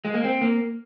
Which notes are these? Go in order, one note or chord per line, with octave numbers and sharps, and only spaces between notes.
G#3
A#3
C4
A#3